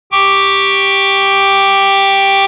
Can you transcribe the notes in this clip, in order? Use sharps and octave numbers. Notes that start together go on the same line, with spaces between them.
G4 G5 C#6 D6